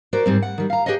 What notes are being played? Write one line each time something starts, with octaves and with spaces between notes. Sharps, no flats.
F#4 A#4 C5 D5
G#2 G3 C4
F#5
D#3 G3
F5 A#5
G4 G#4 B4 C#5 D#5